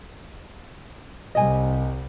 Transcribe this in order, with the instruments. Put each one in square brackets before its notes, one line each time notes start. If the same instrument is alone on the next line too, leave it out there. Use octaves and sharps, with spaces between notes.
[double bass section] C2 G3 [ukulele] D#5 G#5